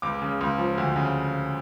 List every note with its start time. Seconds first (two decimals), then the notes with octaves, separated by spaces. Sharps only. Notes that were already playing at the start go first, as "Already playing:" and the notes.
0.02 C#2 D6
0.22 C#3
0.41 C#2
0.58 F3
0.78 D2
0.96 C#3